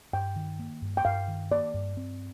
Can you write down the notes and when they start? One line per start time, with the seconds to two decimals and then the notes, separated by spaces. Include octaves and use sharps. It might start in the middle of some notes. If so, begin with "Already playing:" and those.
0.13 G2 G5
0.36 D#3
0.59 A#3
0.82 G2
0.97 G5
1.05 G2 F5
1.28 D#3
1.51 A#3 D5
1.74 G2
1.97 C4